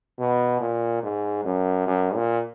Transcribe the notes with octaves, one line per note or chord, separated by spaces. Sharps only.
B2
A#2
G#2
F#2
F#2
A#2